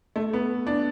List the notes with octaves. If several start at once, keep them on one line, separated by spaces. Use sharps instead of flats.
A3
B3
D4